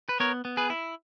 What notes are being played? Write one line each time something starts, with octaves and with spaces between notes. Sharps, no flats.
B4
B3 A#4 C#5
B3
G#4 B4
E4